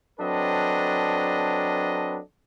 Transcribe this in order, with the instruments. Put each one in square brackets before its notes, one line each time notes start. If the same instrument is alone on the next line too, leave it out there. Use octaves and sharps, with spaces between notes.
[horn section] F#3 C4 D4 A4 B4 D#5